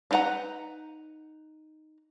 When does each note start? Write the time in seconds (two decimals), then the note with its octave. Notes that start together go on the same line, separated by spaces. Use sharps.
0.11 D4 D#4 B4 F#5 A#5